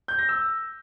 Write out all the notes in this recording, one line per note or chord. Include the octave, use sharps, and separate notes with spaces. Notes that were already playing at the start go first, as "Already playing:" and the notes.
G6
A#6
E6